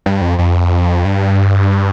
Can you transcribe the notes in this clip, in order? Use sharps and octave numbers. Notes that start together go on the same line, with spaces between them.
G2
F2
F2
G2